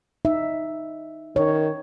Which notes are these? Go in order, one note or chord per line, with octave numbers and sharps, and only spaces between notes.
D#4 E5
D#3 C#5